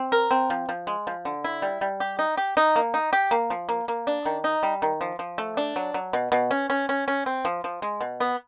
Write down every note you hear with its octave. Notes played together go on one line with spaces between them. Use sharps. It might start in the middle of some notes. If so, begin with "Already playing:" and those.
Already playing: C4
A#4
C4
F3
F3
G#3
F3
D3
E4
G3
G3
G4
D#4
G4
D#4
A#3
D#4
G4
A#3
F3
A#3
A#3
D4
D#3
D#4
G3
D#3
F3
F3
A3
D4
F#3
F#3
B2
B2
C#4
C#4
C#4
C#4
C4
F3
F3
G#3
B2
B3